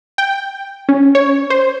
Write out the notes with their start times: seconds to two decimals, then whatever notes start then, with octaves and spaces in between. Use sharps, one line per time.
0.18 G5
0.89 C#4
1.15 C#5
1.50 C5